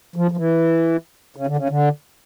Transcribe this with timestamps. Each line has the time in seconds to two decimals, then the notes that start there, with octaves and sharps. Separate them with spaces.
0.16 F3
0.31 F3
0.37 E3
1.36 C#3
1.47 D3
1.57 C#3
1.69 D3